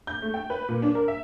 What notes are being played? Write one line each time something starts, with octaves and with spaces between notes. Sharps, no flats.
G6
A3
G5
B4
A#2
D4
A#4
E5